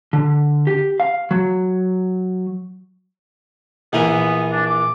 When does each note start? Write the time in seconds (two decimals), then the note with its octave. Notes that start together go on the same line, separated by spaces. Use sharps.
0.13 D3
0.67 G4
1.00 F5
1.31 F#3
3.93 A#1 E3 B3 A#4
4.52 D4
4.66 D6